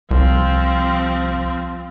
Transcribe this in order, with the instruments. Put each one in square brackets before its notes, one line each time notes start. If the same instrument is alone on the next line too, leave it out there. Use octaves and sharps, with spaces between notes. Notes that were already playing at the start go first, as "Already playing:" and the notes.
[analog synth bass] C2 [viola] F3 C4